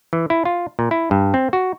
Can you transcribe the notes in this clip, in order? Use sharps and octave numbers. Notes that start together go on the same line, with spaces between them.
E3
E4
F4
A#2
E4
G2
C4
F#4